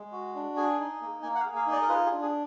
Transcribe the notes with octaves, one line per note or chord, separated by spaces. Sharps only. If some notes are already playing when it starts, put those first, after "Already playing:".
Already playing: G#3
F#4
D4
G#4 G#5
D#4
A#3
A#3 G#5
F#5
F5
G#4
F5
D#4
D5
A#4
F4 B4
G#4
D4
G#4